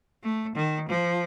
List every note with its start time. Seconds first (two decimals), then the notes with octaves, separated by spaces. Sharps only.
0.23 A3
0.55 D#3
0.89 F3